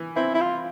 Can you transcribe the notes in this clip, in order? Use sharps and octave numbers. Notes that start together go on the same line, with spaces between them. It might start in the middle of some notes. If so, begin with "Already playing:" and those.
Already playing: E3
C4 E4
E4
F4